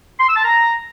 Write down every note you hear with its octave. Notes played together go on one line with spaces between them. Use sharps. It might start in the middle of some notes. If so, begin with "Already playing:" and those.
C6
E6
A5
A#5